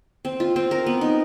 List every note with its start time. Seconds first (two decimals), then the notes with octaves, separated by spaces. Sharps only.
0.25 C4
0.40 F4
0.56 C4
0.71 A#4
0.86 B3
1.01 D#4